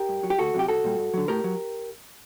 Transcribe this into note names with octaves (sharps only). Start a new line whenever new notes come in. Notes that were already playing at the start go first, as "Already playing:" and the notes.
Already playing: G4 A#4
G2
F#3
G4
D2 F#4 A4
C3 F#3 G4
C2 F#4 A4
A#2 G3
G2
D3 F#3
A2 G4 A#4
F#3